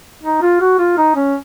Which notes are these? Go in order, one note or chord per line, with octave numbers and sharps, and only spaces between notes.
D#4
F4
F#4
F4
D#4
C#4